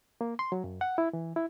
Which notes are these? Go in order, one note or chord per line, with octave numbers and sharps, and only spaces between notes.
A#3
C6
F#3
F#2
F#5
E4
E3
E4